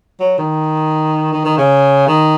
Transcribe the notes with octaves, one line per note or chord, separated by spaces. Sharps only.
F#3
D#3
D#3
D#3
C#3
D#3